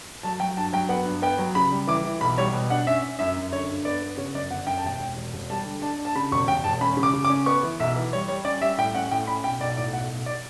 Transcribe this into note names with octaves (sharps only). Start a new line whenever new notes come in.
F#3 A5
F#3 G5
G2 A5
F#3 G5
B3 F#5
G2
B3 G5
F#3
C#3 B5
G3
E3 D6
E3
B1 B5
G3 C#5
B2
D4 F#5
C#4 E5
C#4
F#2 E5
F#2
D3 C#5
G2
B3 D5
B3
C#3 C#5
F#2 D5
G1 F#5
F#2 G5
A5
E1 G5
E1
E1
E1
G3 A5
D3
D4 A5
D4
A5
C#3 B5
E1 C#6
E1 G5
E1 A5
C#4 B5
C#3
D6
C#3
D6
C#4
B3 C#6
E3
B1 E5
E3
G3 C#5
G3 C#5
C#4 D5
G3 E5
A2 G5
C#4 F#5
A2 G5
C#4 B5
B1 G5
B1 D5
A2 D5
B1 F#5
B1
D5